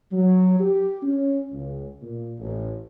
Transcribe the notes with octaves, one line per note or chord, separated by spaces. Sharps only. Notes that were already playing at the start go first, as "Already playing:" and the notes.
F#3
G4
C#4
C#2
A#2
A1